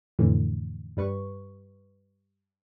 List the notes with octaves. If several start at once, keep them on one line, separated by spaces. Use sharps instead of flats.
F2 A2 D3 E3
G2 G3 B4 C#6